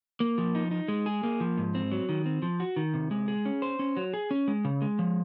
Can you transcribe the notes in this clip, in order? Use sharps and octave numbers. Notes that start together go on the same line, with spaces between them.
A#3
F3
D#4
D#4
G#3
G#4
A#3
F3
G#2
C4
F#3
D#3
C4
F3
F#4
D#3
C3
G#3
G#4
C#4
C5
C#4
F#3
G#4
C#4
G#3
C#3
G#3
F3